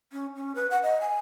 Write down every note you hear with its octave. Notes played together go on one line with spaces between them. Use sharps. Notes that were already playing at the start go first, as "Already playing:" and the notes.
C#4
C#4
B4
F#5
D#5
G#5